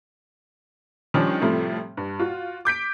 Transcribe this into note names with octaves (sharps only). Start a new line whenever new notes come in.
D#3 F3 G3 C#4 D4
A2 C3 F3 G3 A3
G2
F4 F#4
D6 G6 B6 D7